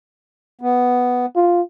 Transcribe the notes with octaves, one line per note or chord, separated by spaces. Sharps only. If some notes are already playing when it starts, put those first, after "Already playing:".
B3
F4